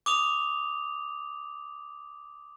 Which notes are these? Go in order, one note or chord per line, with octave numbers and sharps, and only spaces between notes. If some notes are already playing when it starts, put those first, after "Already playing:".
D6 D#6 F7